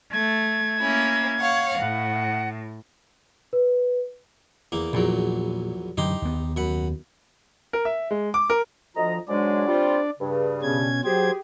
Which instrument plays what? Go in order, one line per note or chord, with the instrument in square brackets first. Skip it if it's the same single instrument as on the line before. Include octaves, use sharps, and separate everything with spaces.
[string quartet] A3 [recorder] G#6
[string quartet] A#3 C#4 E4
C#5 F5 F#5
[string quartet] A2 [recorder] F#5
[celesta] B4
[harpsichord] E2 A#3
[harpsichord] A#1 E2 F#3 [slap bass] A#2
[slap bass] F#2 D3 E3 [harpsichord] D#4 G4 C6
[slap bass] D#2 B3
[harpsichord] F#2 F#5 B5
[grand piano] A#4
E5
G#3
D6
A#4
[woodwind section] D2 D#5 A#5 [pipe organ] F3
[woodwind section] G#2 F#3 G#3 [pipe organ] D4 D5
[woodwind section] G3 C4 F4
G2 C#3
[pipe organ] B2 C#4 G#6
[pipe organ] F#3 C5 G#6 [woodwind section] G4 G#4